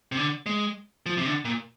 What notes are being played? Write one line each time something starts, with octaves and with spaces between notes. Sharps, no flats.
C3
D3
G#3
F3
C3
D3
A#2